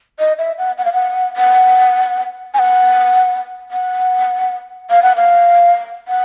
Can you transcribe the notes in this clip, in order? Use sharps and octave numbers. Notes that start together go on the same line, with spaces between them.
D#5
E5
F#5
F#5
F5
F#5
F#5
G#5
F#5
F#5
F5
F#5
F5
F#5